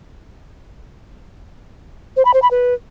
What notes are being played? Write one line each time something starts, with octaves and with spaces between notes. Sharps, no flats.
C5
B5
C5
B5
B4